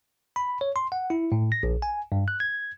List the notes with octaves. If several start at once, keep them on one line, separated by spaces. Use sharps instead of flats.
B5
C#5
C6
F#5
E4
A2
A#6
A#1
G#5
G2
F#6
G#6